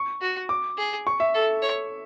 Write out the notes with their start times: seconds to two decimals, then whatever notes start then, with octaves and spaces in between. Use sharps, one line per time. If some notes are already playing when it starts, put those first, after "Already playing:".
Already playing: C#6
0.21 F#4
0.49 D6
0.77 G#4
1.07 C#6
1.20 E5
1.34 A4
1.62 C#5